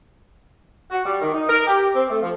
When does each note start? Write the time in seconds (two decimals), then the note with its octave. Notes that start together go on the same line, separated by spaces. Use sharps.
0.92 F#4
1.06 G3
1.22 D#3
1.34 D#4
1.49 A#4
1.67 G4
1.95 C4
2.10 A3
2.22 F3